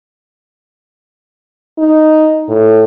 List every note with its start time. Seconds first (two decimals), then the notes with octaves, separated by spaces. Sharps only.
1.78 D#4
2.49 A2